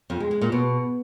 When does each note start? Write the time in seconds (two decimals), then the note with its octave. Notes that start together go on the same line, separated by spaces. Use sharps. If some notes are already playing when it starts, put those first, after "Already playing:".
0.10 F2
0.20 G#3
0.31 G#3
0.42 A#2
0.52 B2